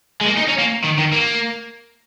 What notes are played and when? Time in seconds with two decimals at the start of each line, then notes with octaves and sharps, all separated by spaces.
0.21 G#3
0.26 A#3
0.37 D#4
0.48 C#4
0.58 A#3
0.84 D#3
0.98 D#3
1.13 A#3